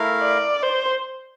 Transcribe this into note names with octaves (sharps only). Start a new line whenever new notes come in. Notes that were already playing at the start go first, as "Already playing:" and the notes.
Already playing: A3 E4 A#4 F5
D5
C5